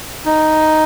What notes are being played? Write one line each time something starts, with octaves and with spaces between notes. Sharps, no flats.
D#4